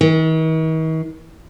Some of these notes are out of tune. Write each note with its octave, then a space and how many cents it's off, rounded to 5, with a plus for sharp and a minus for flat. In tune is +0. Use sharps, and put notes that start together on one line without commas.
D#3 +45